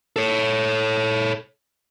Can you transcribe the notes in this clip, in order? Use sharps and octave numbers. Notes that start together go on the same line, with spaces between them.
A4 C#5